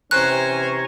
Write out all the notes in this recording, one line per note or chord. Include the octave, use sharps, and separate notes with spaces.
C3 E3 C#4 C5 G#5 A#5 C#6 F#6